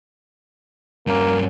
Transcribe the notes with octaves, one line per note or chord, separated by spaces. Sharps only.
G2 A#3 C#4